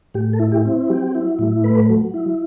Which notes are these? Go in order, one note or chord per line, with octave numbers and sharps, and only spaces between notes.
A2 G4
A4
E4
G4
C4
F#3 G4
E4
A2
A3 B4
F#3
E4